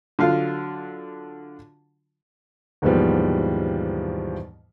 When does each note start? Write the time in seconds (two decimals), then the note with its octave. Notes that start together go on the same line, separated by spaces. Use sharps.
0.19 D3 F#3 F4 F5
2.82 D#2 G#2 B2 E3 F3 G3